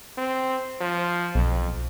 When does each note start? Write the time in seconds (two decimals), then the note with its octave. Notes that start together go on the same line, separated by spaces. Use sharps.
0.17 C4
0.80 F3
1.35 B1 F2